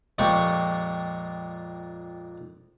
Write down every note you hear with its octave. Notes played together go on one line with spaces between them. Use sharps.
F2 A#2 G#3 G4 C#6